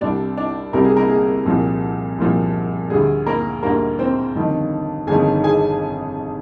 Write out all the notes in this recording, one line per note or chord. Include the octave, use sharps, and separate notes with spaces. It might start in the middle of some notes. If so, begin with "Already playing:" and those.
C2 C3 G3 D4 D5
D4 D5
C2 C3 G3 A#4
G#4
A#3 A#4
G#4
C2 A#2 F3
C2 A#2 F3
D2 D3 G3 G#4
A#3 A#4
D2 D3 G3 A#3 A#4
C4 C5
G1 F2 D#3
G1 F2 D#3 G#4 G#5
G#4 G#5